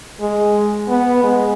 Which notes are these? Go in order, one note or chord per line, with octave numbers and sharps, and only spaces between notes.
G#3
B3
G#3